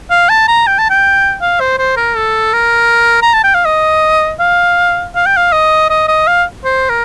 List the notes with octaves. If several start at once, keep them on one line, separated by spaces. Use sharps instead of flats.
F5
A5
A#5
G5
A5
G5
F5
C5
C5
A#4
A4
A#4
A#5
A5
G5
F5
D#5
F5
F5
G5
F5
D#5
D#5
D#5
F5
C5
A#4